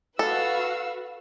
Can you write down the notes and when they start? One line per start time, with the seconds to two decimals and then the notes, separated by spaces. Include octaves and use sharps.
0.19 F#4 A4 B4 F5 E6